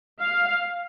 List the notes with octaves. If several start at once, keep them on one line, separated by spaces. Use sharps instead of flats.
F5